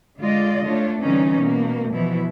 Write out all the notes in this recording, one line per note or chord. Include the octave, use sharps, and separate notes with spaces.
D3 G#3 F4 D5 D#5
A3 D4 F4 C#5
D3 E3 G3 C4 C#4 D#4
B2 A#3
B2 E3 F3 E4